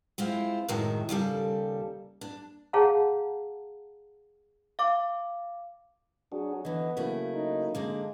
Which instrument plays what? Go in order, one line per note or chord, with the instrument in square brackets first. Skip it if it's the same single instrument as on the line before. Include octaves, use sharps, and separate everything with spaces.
[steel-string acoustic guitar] G#3 C4 E4 F4
F#2 A2 C3 D#3 F#3 G#3
D#2 C#3 G3 A4
D4
[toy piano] G#4 C#5 F5 F#5 A5 A#5
[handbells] F5 D6
[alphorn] F#3 [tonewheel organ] D4 F#4 G#4
[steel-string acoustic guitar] D3 E3 [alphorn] B3 [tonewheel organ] D#5
[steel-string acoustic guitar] C#3 A3 E4 [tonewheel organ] F#3 A#3
[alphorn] D#4
[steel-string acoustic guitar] D3 A#3 D#5 [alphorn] G#3